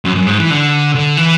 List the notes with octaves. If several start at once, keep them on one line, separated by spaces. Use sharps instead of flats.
F#2
F#2
G#2
E3
D3
D3
E3